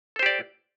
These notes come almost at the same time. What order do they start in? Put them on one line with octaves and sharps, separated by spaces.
A4 C5 G4 D5